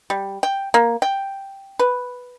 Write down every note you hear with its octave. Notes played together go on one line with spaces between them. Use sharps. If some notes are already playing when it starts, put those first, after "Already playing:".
G3
G5
A#3
G5
B4